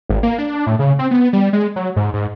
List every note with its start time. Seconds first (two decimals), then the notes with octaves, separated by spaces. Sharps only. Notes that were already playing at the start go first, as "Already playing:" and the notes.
0.09 G#1
0.23 A#3
0.38 D4
0.67 A2
0.79 C#3
0.99 C4
1.11 B3
1.33 G3
1.53 G#3
1.76 F#3
1.96 G#2
2.13 G#2